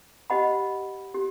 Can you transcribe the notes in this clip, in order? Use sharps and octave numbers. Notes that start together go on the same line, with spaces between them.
G4 C5 D#5 F#5 B5
G4